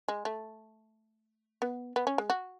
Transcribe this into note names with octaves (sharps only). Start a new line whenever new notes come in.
G#3
A3
B3
B3
C#4
G#3
F#4